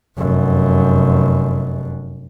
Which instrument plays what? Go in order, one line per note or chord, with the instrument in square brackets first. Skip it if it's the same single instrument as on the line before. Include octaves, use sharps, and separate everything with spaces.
[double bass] F1 F#2